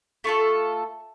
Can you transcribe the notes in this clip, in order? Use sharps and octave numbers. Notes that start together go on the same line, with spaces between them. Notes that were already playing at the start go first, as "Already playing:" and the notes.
A3 F4 A4 C#6